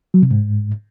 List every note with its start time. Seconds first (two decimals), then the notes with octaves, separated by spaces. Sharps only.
0.14 F#3
0.22 C3
0.31 G#2